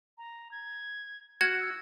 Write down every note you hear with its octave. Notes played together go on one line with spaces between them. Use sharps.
A#5
G#6
F#4 F6 G#6
E6